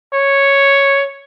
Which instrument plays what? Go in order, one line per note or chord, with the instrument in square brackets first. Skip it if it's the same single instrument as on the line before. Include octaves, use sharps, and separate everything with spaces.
[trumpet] C#5